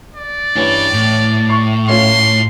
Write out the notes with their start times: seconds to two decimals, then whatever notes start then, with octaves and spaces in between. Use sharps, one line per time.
0.15 D5
0.56 E3 C#4 D4 G4
0.93 A2
1.49 C#6 C7
1.88 A3 C#4 F4 C6